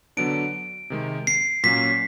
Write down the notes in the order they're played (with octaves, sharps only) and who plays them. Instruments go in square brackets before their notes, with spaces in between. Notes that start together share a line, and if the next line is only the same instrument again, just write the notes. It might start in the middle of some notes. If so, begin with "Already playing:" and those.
[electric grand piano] D3 F#3 B3 D4 [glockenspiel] D7
[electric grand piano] C3 D#3 G#3
[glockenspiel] C7
[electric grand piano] A#2 F#3 A#3 C#4 [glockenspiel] B6